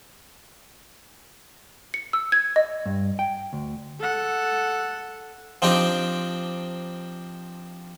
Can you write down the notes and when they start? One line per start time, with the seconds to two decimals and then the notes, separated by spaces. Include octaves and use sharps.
1.94 C#7
2.13 E6
2.32 G#6
2.56 D#5
2.86 G2
3.19 G5
3.53 D2
4.00 A4 F#5
5.62 F3 C4 D4 D#4 G4